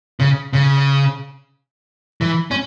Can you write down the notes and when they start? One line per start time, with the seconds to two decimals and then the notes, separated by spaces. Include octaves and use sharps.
0.20 C#3
0.53 C#3
2.21 E3
2.51 C#4